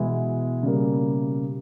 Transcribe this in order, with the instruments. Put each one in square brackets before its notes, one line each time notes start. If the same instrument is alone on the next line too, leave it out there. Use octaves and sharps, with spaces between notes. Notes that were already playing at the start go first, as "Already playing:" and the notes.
Already playing: [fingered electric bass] B2 [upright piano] E3 G#3 B3 E4
[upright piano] C#3 G3 A#3